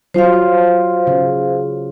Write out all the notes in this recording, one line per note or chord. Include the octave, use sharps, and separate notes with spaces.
F#3 F4 C5 F5
C#3